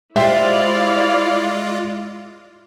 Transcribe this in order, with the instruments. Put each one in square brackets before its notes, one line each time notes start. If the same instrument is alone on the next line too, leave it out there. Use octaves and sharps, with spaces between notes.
[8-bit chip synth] G#3 F4 [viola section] E4 D5 F5 [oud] G4 C5 [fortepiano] E5